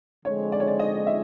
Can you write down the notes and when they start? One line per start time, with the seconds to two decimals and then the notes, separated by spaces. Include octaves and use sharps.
0.24 D3 F3 G#3 C4 C#5
0.52 D5
0.60 C#5
0.67 D5
0.79 D#5
1.07 E5